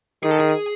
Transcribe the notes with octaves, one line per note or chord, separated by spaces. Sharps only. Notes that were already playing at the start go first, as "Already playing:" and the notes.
D#3 G#4
A4
G#4